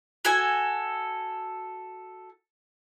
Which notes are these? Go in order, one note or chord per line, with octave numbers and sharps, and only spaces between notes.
F#4 A4 G#5